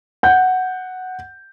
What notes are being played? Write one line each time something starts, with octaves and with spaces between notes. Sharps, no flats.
F#5 G6